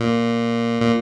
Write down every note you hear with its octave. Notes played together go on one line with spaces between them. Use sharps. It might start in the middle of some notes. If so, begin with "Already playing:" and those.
Already playing: A#2
A#2